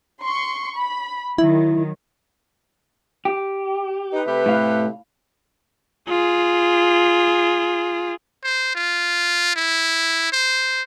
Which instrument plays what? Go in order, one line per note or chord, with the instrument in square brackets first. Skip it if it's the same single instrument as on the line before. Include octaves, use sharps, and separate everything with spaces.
[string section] C6 C#6
B5
[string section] D#3 F#3 [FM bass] E4
[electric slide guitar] G4
[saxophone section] D#4 [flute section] B4
[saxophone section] C3 A3 G4
[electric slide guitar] A2 F5
[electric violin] F4 G#4
[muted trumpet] C5
F4
E4
C5